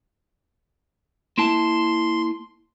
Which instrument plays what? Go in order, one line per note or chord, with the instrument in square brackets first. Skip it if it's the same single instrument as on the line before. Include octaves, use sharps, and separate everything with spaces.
[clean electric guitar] A#3 E4 A5 [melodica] C6